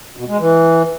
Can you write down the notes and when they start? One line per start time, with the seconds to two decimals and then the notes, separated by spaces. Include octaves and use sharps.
0.17 B2
0.28 G#3
0.39 E3